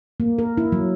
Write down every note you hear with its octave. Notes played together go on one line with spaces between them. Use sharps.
A#3
A#4
E4
F#3